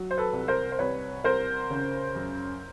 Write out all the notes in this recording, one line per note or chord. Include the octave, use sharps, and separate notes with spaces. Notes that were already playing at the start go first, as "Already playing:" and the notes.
Already playing: F#3
C5
A4 B4
C2
A#4 C5
C5
C2 B4 C#5
C2 A#4 C5
C#3
F#2